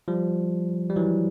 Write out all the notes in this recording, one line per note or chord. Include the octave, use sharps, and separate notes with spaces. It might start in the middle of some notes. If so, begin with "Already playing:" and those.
F3 G3
G3
E3 F#3